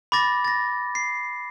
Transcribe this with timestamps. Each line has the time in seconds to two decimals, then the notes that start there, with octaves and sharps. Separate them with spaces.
0.12 B5 D6 A6 A#6
0.45 A6 A#6
0.95 C7